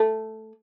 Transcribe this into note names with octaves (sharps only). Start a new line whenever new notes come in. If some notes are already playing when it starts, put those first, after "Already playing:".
Already playing: A3